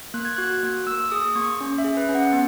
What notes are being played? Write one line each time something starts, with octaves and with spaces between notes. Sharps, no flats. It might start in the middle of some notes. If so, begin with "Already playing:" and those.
A#3 F#6
G#6
F#4 F#6
A#3
A#3 E6
G#4 D#6
A#3 C#6
C#4
E5
G#4
B4
C#4
F#5
B3